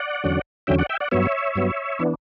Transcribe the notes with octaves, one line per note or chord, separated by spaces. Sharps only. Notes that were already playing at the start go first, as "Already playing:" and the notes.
Already playing: D5 F#5
E2 D3 F#3 C#4
E2 D3 F#3 C#4 E5 G5
D5 F#5
E5 G5
D5 F#5
G2 F#3 B3 C#5 E5
G2 F#3 B3
E3 B3 D4